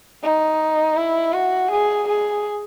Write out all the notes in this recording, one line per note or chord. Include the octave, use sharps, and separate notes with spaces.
D#4
E4
F#4
G#4
G#4